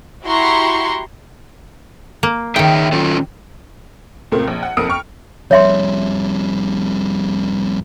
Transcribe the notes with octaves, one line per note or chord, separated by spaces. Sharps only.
E4 F#4 G4 A#5 C6 C#6
A#3
D#3 D#4 G#4 E5 G5
C#4 F4 A4
C#2 A#2 A3 A#3 C4
A#1
F#5
B1 F2 A#3 D#6 C#7 D7
G5 C#6 F6
F2 G3 C#5 E5 C6